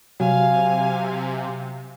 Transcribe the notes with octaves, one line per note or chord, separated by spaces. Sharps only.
C3 F#3 F5 G#5